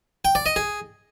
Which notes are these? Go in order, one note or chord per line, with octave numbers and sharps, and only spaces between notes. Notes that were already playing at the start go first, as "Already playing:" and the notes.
G5
D5
D#5
G#4